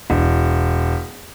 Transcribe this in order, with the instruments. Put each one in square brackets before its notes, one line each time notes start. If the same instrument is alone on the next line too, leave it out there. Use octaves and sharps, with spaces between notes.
[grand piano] E1